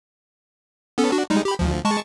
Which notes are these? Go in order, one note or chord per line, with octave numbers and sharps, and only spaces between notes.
B3 C#4 A4
D4 F#4
G3 G#3 D#4
G4 B5
D2 F3
G#3 A5 C#6